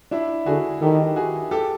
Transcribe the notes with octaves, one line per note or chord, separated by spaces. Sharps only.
D4 E4
D3 F#4 G#4
D#3 G4 A4
F#4 G#4
G4 A4